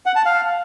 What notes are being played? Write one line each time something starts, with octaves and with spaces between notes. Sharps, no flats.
F#5
A5
F5